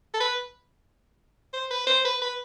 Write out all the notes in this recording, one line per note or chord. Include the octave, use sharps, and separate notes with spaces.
A4
B4
C5
B4
C5
B4
B4